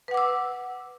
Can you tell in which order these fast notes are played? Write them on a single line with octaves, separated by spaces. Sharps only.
B4 F#5 D6 E6